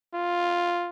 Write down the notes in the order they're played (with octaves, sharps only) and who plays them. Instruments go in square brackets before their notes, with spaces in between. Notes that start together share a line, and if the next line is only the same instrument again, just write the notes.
[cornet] F4